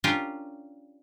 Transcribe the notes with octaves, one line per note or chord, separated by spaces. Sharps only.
C#4 D4 F4 G4 A#4